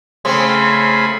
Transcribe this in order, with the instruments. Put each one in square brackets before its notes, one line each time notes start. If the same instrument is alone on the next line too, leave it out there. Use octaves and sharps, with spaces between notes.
[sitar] C#3 C4 [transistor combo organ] A3 G#4 B5 [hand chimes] C6